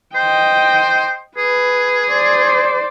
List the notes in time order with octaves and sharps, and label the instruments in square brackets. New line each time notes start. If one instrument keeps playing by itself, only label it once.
[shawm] C5 [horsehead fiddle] D#5 G5
[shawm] G#4 [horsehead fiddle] B4
[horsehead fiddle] C5 D5